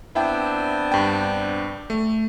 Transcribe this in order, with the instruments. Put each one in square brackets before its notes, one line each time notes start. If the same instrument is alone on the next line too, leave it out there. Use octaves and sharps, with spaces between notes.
[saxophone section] B3 C4 D4 [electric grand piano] E4 E5 G5
[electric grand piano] G2 G5
A3